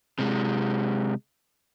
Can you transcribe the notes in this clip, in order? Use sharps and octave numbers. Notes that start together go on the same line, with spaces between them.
C3 G#3